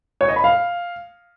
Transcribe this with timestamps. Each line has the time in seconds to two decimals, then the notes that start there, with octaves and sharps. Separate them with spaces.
0.21 C#5
0.28 D#5
0.36 B5
0.44 F5